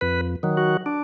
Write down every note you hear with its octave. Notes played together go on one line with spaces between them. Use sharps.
F2 B4
D#3 F#3
F#4
D4